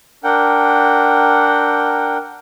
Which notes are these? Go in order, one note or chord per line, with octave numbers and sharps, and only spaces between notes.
D4 A#4 F#5 G5